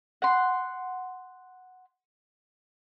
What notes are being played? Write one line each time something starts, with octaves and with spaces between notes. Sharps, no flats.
F#5 C6